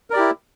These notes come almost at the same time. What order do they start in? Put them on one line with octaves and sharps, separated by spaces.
A#4 D5 G4 E4